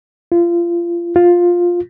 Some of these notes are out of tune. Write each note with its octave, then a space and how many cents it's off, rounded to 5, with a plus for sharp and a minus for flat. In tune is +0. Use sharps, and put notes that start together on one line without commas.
F4 -25
F4 +10